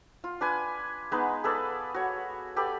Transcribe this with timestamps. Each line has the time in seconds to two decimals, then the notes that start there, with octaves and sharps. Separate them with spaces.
0.24 F4
0.41 D4 B4 G#5
1.12 G#3 B3 D#4 B4
1.44 G#4 A4 B4 D5
1.94 F#4 C#5
2.56 G4 A4 B4 D5